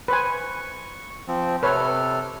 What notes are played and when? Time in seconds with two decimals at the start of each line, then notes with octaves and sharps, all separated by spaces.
0.08 B4 C5 G#5 C#6
1.28 F3 C4
1.63 C3 A4 B4 C#5 F6